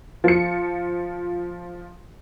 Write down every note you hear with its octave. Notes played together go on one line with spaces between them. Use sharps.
F3 C#7